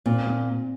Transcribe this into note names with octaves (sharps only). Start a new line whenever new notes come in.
A#2 C4
C4